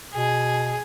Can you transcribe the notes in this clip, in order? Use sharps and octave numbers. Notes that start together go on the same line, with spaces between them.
B2 G#4